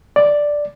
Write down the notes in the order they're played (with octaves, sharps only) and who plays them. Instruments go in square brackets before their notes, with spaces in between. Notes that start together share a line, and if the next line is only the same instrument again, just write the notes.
[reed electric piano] D5